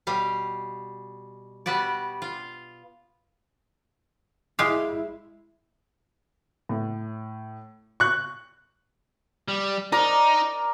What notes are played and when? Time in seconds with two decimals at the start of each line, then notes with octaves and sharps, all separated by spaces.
0.07 B2 G3 F5
1.66 G3 B3 F#4 D5
2.22 F4
4.59 G#3 E4 G4 F5
6.69 A2
8.00 C#6 F#6
9.48 G3
9.92 D#4 A#4 D5